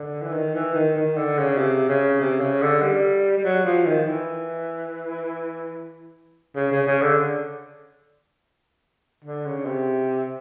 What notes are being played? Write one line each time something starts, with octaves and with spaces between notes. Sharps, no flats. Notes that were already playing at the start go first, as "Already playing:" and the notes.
Already playing: D3
E3
D#3
E3
D#3
D#3
D3
C#3
C3
C#3
C3
C#3
D3
G3
G3
F#3
F3
D#3
E3
C#3
C#3
C#3
D3
D3
C#3
C3